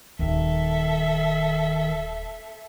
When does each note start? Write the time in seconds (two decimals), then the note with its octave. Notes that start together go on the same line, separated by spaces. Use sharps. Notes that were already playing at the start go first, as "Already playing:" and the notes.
0.19 D#1 D#3 A4 E5